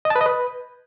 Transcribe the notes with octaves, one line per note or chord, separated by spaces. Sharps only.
D#5
A5
B4
D#5
B4